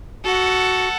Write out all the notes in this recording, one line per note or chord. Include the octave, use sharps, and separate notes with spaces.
F#4 A4 F#5